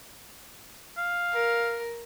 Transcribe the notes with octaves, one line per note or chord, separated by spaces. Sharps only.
F5
A#4